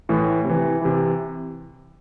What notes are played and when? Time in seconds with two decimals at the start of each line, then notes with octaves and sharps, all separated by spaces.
0.09 A2 E3
0.44 C3 E3
0.82 C3 E3